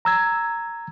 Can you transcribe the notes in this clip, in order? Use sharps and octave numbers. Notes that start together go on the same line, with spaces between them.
A#5 E6 G#6